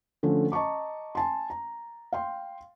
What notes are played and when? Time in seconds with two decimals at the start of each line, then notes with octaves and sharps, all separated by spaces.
0.23 D3 F3 A3 C#4
0.52 D#5 A5 A#5 C#6 D6
1.15 G#5 A5 C6
1.50 A#5
2.12 F5 G5 C6